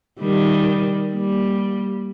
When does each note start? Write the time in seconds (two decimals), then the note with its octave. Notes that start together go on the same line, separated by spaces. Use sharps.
0.20 D#3 G3
1.14 G3 A#3